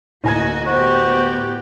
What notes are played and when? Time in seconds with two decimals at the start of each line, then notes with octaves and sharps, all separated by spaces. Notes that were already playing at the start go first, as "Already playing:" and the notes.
0.24 D1 A#3 F#4 D#5 G#5 G#6
0.67 B3 F#4 G4 C5